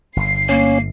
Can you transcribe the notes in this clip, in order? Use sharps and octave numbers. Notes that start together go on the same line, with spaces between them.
G1 C7
A#3 C#4